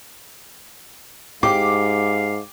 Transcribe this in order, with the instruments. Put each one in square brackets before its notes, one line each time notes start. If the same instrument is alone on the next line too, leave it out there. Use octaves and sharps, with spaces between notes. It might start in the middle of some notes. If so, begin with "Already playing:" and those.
[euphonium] G#2 [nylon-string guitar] G4 [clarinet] F5 [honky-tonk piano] D6